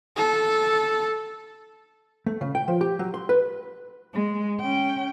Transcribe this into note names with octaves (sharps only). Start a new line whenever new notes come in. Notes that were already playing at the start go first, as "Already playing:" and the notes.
A4
A3
C#3
G5
F3
G4
F#3
C6
B4
G#3
C#4 G5